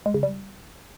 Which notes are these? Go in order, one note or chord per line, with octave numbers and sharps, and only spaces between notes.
G#3
C#3
G3